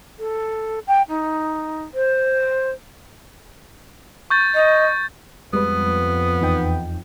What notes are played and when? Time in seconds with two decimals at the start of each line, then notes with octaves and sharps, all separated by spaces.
0.19 A4
0.87 G5
1.09 D#4
1.94 C5
4.30 C#6 G6 A6
4.55 D#5
5.53 F2 G3 G#3 B3 B4
6.42 E2 D#4 G5